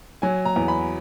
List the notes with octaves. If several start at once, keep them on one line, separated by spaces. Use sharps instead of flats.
F#3 G#5
A#5
E2
B5